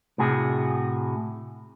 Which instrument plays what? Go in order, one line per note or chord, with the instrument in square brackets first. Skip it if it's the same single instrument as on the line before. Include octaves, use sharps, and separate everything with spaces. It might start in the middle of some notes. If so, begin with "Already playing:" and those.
[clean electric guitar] A2 C3 F#4 G#4